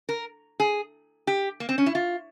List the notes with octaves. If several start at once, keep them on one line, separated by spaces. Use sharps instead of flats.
A#4
G#4
G4
A#3
C4
C#4
E4
F4